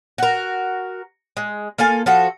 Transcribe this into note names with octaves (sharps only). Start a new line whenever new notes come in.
F#4 A#4
G#3
A#3 F4 A4 G#5
F3 F#4 A4